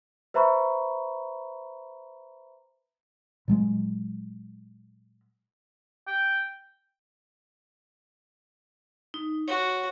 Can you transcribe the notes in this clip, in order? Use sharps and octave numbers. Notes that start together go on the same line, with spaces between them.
B4 C5 E5 A#5 B5 C#6
A#2 F#3 G#3
G5
D#4
F#4 C#5